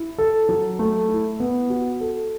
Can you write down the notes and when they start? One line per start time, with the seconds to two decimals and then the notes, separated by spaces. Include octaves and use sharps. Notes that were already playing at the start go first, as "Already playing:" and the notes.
Already playing: E4
0.18 A4
0.49 F#3
0.79 A3
1.09 E4
1.40 B3
1.70 F#4
2.00 A4